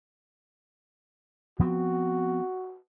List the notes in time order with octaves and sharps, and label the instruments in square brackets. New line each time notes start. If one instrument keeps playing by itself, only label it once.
[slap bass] F3 B3 C4 [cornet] F#4